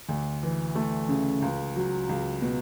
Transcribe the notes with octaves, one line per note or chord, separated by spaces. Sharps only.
D2
E3
A3
C#3
C#2
F#3
C#2
B2